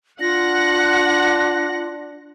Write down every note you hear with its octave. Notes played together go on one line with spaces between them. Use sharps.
D4 F4 F#5 A#6